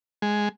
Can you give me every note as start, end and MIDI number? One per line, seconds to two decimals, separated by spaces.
0.22 0.49 56